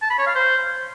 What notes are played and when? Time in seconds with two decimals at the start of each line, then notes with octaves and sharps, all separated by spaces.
0.02 A5
0.10 B5
0.19 C#5
0.27 F5
0.35 C5